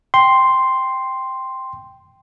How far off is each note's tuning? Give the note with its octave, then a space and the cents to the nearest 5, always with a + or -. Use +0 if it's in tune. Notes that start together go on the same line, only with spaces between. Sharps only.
G5 +0 C6 +0